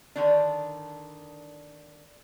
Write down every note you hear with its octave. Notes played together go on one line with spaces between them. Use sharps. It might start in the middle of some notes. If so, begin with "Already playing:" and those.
D3 D#3 D4